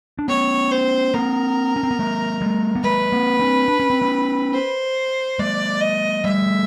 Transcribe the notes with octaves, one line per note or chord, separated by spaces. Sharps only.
D4
B3 C#4 C#5
C5
A#3 C4 A#4
C#4
C4
B3
G#3 A#3
G3 A3
B3
G#3 A#3 B4
A#3 C4
C4 D4
D4
C#4
C4
B3 C#4
C5
G#3 A#3 D5
D#5
G3 A3 E5